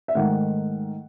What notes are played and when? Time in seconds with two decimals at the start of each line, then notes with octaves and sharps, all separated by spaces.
0.08 E5
0.15 G#2 D#3 A3 F#5